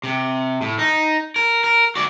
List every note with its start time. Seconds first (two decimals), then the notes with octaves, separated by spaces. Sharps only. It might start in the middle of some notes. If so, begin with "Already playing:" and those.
0.04 C3
0.62 A2
0.79 D#4
1.36 A#4
1.64 A#4
1.95 F#4 D5